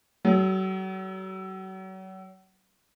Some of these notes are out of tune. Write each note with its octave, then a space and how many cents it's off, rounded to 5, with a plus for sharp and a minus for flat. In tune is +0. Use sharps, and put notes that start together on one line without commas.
F#3 +40 A4 -35